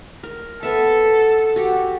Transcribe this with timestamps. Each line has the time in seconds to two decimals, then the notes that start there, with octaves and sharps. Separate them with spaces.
0.23 A#4
0.63 B3 A4 E5
1.56 F#4 G4